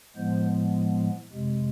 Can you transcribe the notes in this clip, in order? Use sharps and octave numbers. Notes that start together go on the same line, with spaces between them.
A2 F3 G#3 B3 C5
F2 C3 G#3